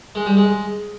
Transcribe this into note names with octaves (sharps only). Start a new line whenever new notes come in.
G#3
G3
G#3